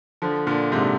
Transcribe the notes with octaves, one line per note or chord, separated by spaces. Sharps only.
D3 F3
A#2 D3
G#2 C3